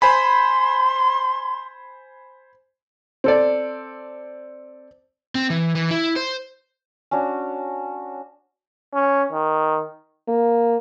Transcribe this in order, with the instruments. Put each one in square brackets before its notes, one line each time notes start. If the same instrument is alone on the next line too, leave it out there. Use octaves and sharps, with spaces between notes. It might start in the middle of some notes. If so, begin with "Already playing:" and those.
[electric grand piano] C5 G#5 B5 [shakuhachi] C6
[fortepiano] C4 A4 D5
[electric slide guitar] C4
E3
E3
E4
C5
[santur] C#4 D4 F#4
[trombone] C#4
D#3
[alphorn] A#3